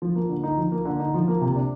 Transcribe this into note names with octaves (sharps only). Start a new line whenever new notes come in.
F3
A#3
D3
D#4
F3
A#3
D3
D#4
F3
A#3
C3
D4